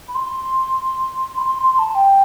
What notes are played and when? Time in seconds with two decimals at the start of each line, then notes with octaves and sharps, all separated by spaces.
0.08 B5
0.15 C6
1.38 B5
1.46 C6
1.62 C6
1.78 A5
1.95 G5